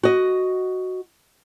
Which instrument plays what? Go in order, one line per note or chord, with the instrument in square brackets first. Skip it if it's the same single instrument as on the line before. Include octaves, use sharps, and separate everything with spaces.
[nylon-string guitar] F#4 D#5